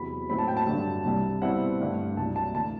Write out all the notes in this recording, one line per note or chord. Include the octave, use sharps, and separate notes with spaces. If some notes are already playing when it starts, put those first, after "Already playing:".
Already playing: E2 C3 F#3 B5
A2 F#3 C4 B5
A5
G5
A5
G2 D3 F#3
C2 C3 G3
B2 G3 C4 E4 F#5
G2 D3 A3
C2 C3 F#3 A5
A5
D2 C3 E3 A5